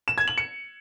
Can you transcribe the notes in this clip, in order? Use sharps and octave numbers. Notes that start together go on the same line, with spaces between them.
E7
G#6
F#7
C#7